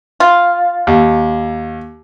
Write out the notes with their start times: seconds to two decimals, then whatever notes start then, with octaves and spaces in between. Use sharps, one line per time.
0.20 F4
0.87 D#2